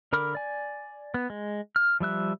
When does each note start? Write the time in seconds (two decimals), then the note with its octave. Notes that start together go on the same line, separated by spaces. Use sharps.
0.13 D3 A#4 B5 D6 F6
0.35 D5 G#5
1.14 B3
1.30 G#3
1.76 F6
2.00 F3 G3 E5 F#6